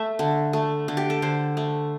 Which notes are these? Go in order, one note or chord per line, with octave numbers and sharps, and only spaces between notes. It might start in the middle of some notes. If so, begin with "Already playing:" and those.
Already playing: A3 E5
D3
A3
D3
G4
A4
D3 C5
A3